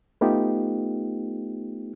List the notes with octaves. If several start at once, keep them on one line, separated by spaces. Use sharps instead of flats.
A3 B3 D#4 F4 G4